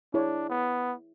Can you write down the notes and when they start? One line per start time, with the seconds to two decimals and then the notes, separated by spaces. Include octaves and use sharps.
0.14 D4 E4 G#4 C#5
0.50 B3